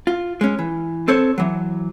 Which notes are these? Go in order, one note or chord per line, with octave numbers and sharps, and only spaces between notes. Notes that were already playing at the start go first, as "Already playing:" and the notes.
F4
G#3 C#4
E3
C4 A4 C5 C#5
E3 F#3